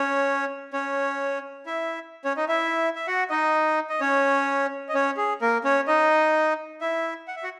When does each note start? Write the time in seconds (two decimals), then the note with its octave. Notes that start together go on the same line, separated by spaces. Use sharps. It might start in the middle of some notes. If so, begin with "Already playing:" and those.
Already playing: C#4 C#5
0.73 C#4 C#5
1.66 E4 E5
2.24 C#4 C#5
2.37 D#4 D#5
2.48 E4 E5
2.96 E5
3.07 F#4 F#5
3.30 D#4 D#5
3.89 D#5
4.00 C#4 C#5
4.89 D#5
4.94 C#4 C#5
5.17 G#4
5.41 A#3 A#4
5.64 C#4 C#5
5.87 D#4 D#5
6.81 E4 E5
7.28 F#5
7.36 E5
7.43 F#4 F#5